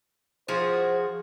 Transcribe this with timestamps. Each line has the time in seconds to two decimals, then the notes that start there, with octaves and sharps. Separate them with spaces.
0.48 F3 F#4 G#4 C5